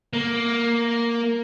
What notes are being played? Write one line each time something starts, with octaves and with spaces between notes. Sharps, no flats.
A#3